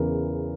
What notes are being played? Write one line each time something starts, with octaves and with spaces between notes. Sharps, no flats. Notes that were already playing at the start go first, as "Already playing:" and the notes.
Already playing: E2 C#3 E3 A#4